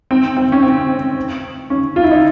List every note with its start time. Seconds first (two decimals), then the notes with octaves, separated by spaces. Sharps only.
0.11 C4
0.37 C4
0.52 C#4
0.63 C4
1.70 C#4
1.96 F4
2.04 E4
2.11 D#4